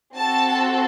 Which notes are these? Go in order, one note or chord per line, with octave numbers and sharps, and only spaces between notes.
C4 F#4 A4 A5